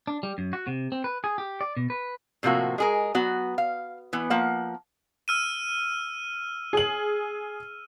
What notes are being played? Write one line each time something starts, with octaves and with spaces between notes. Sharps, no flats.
D4
G3
F#2
F#4
C3
C4
B4
G#4
G4
D5
B2
B4
A2 C3 F3 A#3 F#4
G#3 G#4 A#4
F#3 B3 F#4
F5
E3 B3
F3 A#3 F#5
E6 F6 D#7
G#4 F#7